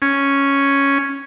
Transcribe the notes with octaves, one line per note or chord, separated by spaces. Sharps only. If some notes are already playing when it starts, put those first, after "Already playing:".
C#4